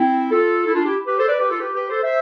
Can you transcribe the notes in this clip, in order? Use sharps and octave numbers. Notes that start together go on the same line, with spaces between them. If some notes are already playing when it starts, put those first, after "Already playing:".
Already playing: C4 E4
F4 A4
E4
D4 F4
E4 G4
G4 B4
A4 C5
B4 D5
G4 B4
F4 A4
G4 B4
G4 B4
A4 C5
C5 E5